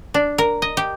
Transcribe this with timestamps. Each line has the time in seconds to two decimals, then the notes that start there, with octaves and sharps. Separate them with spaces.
0.14 D4
0.38 A#4
0.62 D#5
0.77 G4